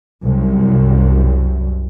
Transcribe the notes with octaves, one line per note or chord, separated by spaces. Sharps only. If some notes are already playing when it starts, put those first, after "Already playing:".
C2 F#2